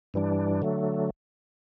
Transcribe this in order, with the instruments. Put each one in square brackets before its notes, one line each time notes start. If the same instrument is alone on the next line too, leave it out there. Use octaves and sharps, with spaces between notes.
[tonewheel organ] G2 E3 G3 D4
D3 F#3 A3